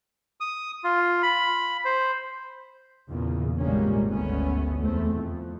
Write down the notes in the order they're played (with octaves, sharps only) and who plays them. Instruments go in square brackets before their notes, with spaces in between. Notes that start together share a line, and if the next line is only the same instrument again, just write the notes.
[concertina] D#6
F4
B5
C5
[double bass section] E2 A#2 C#3
G#1 A#2 G3 G#3 A#3 C#4
G1 D2 A3 B3 C#4
E2 A3 C4
F2